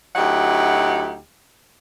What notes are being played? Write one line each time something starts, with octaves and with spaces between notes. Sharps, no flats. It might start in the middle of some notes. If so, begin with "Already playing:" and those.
D2 F#3 D#4 E4 G4 F#5